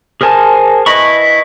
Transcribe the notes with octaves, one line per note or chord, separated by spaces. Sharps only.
G#4 A#4 C5 G#5 A5
E4 B4 D#5 B5 C#6